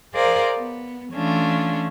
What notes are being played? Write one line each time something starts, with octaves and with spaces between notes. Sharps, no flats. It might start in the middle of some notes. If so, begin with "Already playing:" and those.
G#4 A#4 C5 D5 D#5 F5
B3
E3 A3 C#4 D4 F4